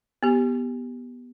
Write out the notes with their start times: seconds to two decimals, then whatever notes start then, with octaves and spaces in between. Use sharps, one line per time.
0.23 B3 G4